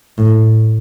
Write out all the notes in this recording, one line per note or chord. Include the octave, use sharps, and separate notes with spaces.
A2